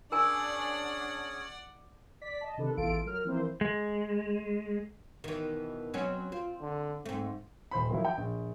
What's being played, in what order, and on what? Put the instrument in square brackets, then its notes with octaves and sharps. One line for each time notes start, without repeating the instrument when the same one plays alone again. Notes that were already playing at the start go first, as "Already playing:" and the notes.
[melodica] C#4 G#4 C#5 [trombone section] D4 [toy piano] A#4 G#5 [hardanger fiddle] D5 F#5
[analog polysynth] D5 B6
D#5 A5
C3 D#3 D4 A4 B4
A1 E2 E3 F4 A4 D7
F#3 A#4 F6
E3 F3 A#3 C4 E4 C5
[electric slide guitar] G#3
[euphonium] B2 [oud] D#3 E3
[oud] F#3 C4 C#4
[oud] C4 [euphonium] F4
[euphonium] D3
[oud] G#2 A3 [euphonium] C4
[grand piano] D#1 C5 B5
D#3 F3 F#3 E4
G5
A#1